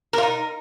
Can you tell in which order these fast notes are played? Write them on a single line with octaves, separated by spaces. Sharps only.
A#4 F4 D#4